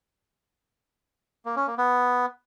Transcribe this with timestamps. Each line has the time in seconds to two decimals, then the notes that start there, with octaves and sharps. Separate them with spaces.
1.45 A#3
1.56 C#4
1.67 A#3
1.78 B3